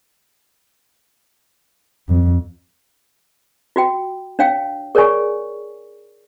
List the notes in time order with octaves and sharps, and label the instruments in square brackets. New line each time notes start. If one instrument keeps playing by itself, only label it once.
[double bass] F2
[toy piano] F4 F#4 G5
D4 C#5 F5 G5
G#4 A#4 C#5 D5 G#5 C#6